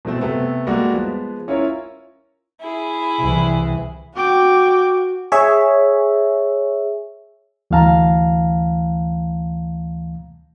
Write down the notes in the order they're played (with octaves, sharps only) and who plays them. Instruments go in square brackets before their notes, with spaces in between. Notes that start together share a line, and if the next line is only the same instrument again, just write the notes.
[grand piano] B2 F3 A3 C4
C3 A3 B3
G3 G#3 A#3 F#4
F3 G#3 B3
C#4 E4 F4 A#4 C#5
[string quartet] E4 G#4
[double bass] C2 E3
[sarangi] F#4 [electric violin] G5 D6
[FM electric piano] G#4 C#5 E5
[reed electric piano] D2 E3 A3 F5 A5 A#5